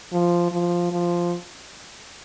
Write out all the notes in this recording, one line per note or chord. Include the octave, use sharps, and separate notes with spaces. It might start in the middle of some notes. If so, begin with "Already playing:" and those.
F3
F3
F3